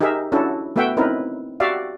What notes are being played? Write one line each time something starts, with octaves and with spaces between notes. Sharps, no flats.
D#4 G4 G#4 A#4 E5
C#4 D4 E4 F#4 A4
A3 B3 F#4 E5 F#5 G5
C4 C#4 D#4 E4 A#4 B4
F#4 G4 D5 E5 F5